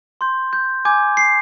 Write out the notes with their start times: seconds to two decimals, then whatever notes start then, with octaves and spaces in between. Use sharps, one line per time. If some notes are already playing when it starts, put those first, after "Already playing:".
0.21 C6 G6
0.53 G6
0.85 G#5 D6 G6 G#6
1.17 C7